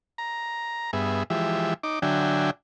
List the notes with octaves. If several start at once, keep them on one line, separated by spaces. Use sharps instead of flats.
A#5
G2 B3 G#4 E5
E3 F3 G#3 G4 E5
D#4 D6
D3 F#3 D4 E5 G5 G#5